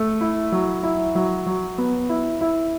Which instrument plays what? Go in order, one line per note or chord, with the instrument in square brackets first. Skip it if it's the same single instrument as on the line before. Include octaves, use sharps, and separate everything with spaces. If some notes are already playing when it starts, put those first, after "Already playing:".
Already playing: [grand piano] A3
E4
F#3
E4
F#3
F#3
B3
E4
E4